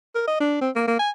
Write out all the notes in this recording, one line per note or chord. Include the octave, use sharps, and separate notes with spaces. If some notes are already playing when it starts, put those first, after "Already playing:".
A#4
D#5
D4
C4
A#3
A#3
G#5